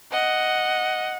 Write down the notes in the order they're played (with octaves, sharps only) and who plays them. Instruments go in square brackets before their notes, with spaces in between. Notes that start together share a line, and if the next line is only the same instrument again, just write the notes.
[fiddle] D#5 [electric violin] F#5